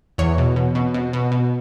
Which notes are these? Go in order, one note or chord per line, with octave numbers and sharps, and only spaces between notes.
E2 C#5
B2
B2
B2
B2
B2
B2